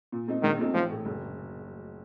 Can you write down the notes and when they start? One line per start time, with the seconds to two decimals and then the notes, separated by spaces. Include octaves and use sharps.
0.12 A#2
0.28 A3 C4 D#4
0.43 A#1 D#3
0.58 A#2 A3 C4 D#4
0.74 A1 F3
0.89 A2 A3
1.05 F#1